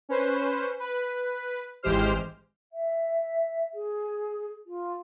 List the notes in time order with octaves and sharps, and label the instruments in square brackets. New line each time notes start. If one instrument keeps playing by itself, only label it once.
[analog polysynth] C#4 B4 C5
B4
G#1 E3 G#3 G4 C5 F6
[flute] E5
G#4
F4